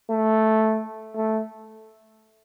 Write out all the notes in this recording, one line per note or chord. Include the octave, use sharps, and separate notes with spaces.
A3
A3